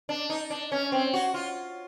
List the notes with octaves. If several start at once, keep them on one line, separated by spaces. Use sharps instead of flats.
D4
D#4
D4
C#4
C4
F#4
F4